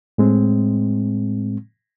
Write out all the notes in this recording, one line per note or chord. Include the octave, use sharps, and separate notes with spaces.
A2 G#3 C4